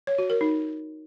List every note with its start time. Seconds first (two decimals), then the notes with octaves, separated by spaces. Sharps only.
0.07 C#5
0.18 F#4
0.30 A#4
0.41 D#4